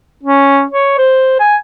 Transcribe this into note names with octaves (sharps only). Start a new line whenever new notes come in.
C#4
C#5
C5
G#5